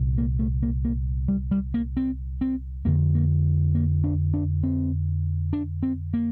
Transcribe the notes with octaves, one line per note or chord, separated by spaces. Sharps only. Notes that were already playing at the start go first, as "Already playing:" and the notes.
Already playing: C2 A#2
A#3
A3
A#3
A#3
G3
G3
A#3
C4
C4
F2 D3 A#3
A#3
A#3
D4
D4
C4
D4
C4
A#3